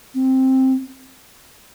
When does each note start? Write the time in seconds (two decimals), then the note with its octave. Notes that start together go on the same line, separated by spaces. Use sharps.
0.14 C4